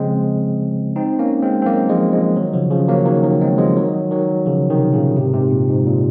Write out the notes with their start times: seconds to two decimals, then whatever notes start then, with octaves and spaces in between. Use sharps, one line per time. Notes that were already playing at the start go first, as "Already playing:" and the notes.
Already playing: C#3 F3 G#3 C4
0.96 C4 D#4
1.19 A#3 C#4
1.42 G#3 C4
1.62 C4
1.66 F#3 A#3
1.89 F3 G#3
2.12 F3 G#3
2.36 D#3 F#3
2.54 C#3 F3
2.71 C#3 F3
2.88 F#3 A#3
3.06 D#3 F#3
3.23 D#3 F#3
3.41 G#3 C4
3.58 F3 G#3
3.77 D#3 F#3
4.11 D#3 F#3
4.46 C#3 F3
4.70 C3 D#3
4.93 A#2 C#3
5.16 G#2 C3
5.33 G#2 C3
5.51 A#2
5.69 G#2
5.86 A#2